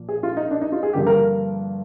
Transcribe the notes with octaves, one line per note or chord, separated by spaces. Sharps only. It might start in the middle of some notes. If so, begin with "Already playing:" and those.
Already playing: A#2 F3 A#3
G#4
F4
D#4
D4
D#4
F4
G#4
G2 D3 F3 A#3 G4
A#4